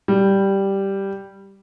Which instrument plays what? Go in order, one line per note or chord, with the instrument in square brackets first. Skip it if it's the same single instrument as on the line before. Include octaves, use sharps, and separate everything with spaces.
[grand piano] G3